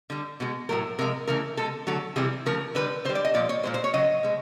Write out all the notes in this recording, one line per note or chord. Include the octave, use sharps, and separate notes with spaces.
D3 G3
B2 G#3
A2 F#3 A3 A#4
C3 F3 G#3 A#4
C#3 E3 A3 A#4
B2 G#3 A4
D3 F#3 A3 A4
C3 E3 G3 G#4
C#3 F3 A3 A#4
D3 G3 B4
D3 G3 C5
D5
D#5
A#2 F3 D5
C#5
A#2 F3 G#3 C5
C5
C#5
C#3 F#3 D#5
B2 G#3